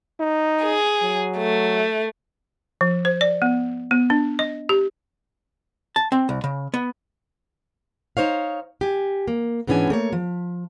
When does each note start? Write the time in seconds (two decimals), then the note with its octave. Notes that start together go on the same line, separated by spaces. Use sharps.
0.20 D#4
0.63 G#4
1.03 F#3
1.38 A3
2.81 F3
3.05 C5
3.21 D5
3.42 B3
3.91 B3
4.10 D4
4.39 D#5
4.69 G4
5.96 A5
6.12 C4
6.29 C2
6.44 C#3
6.74 B3
8.17 D#4 C5 C#5 F5
8.81 G4 G#5
9.28 A#3
9.67 G#2 E3 B3 C#4 D4 G#5
9.90 A3 A#3 C#5
10.12 F3